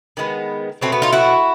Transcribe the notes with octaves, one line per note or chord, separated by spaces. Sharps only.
D#3 G#3 B3
B2 F#3 A3 C4
B3
D#4 F4
E4 F#4